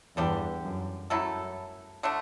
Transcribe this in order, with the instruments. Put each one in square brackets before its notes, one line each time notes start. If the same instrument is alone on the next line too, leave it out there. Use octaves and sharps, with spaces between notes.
[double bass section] E2 G2 [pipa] D3 G3 D4 G4
[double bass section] F#2
[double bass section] F#2 [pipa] F#3 A3 E4 A4
[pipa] D3 A3 D4